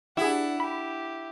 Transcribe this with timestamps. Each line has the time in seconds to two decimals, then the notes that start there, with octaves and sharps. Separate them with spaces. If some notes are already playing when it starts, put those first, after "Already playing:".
0.17 D4 E4 G4 G#4 F#5
0.60 G4 B5